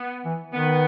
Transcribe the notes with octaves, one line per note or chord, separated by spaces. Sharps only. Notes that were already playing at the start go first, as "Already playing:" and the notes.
Already playing: B3
E3
D#3 B3